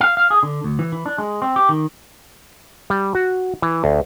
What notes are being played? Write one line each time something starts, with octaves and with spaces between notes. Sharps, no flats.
F5
F5
G#4
D3
D2
E3
E3
D4
G#3
C4
G4
D#3
G3
F#4
E3
D2